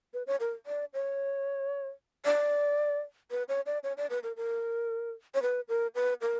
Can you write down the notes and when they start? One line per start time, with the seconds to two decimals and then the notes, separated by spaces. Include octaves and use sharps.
0.14 B4
0.27 C#5
0.40 A#4
0.66 D5
0.94 C#5
2.25 D5
3.31 B4
3.49 C#5
3.66 D5
3.84 C#5
3.97 D5
4.10 B4
4.23 A#4
4.36 A#4
5.34 C#5
5.42 B4
5.69 A#4
5.95 B4
6.21 A#4